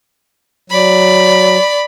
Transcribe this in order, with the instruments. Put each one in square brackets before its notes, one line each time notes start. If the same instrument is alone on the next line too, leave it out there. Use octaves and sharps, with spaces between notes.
[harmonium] F#3 [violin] D5 B5